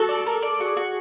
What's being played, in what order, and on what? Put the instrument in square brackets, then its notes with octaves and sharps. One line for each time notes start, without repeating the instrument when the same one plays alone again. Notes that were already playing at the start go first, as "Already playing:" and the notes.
Already playing: [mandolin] F#4 [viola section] A4
[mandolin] D5
A#4
D5
[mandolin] F#4 [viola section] G#4
[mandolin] F#4